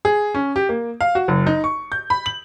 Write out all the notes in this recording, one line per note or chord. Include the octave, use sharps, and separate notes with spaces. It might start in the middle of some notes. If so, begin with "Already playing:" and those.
G#4
C#4
G4
A#3
F5
F#4
F#1
D#4
C#6
G6
B5
F#7